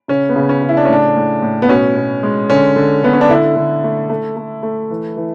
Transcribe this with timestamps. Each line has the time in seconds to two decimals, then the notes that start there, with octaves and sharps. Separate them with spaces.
0.08 C#3 C#4
0.29 B3
0.36 C#3
0.49 C#4
0.62 C#3
0.69 E4
0.77 D4
0.85 C#4
0.89 A2 D4
1.16 A2
1.42 A2
1.62 B3
1.69 B2 C#4
1.96 B2
2.23 G#3
2.50 D3 C#4
2.76 D3
3.03 D3 B3
3.13 C#4
3.21 D4
3.29 D3 E4
3.56 D3
3.84 A3
4.09 A3
4.36 A3
4.63 A3
4.90 E3
5.17 E3